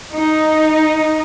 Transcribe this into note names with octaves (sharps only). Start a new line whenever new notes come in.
D#4